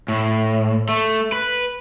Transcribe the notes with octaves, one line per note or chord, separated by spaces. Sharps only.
A2
A3
B4